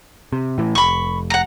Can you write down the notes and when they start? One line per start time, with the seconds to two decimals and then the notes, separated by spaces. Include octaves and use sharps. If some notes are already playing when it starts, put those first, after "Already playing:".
0.33 C3
0.58 A2 E3
0.75 F1 B5 C#6
1.30 F#5 A#5